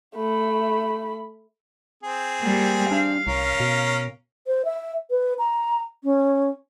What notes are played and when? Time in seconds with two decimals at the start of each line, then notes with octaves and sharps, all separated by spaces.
0.15 A3 B5
2.03 C4 G#4
2.41 G3 A#3
2.91 D4 F5
3.27 C2 C#4 A#4
3.60 B2
4.47 C5
4.65 E5
5.10 B4
5.38 A#5
6.04 C#4